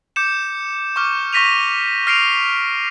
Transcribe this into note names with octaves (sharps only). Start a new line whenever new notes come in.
D6 G6 C#7 E7
C#6 D6 F6
C#6 F6 A#6 B6 D#7 F7
F6 A#6 C7 D7 D#7 F7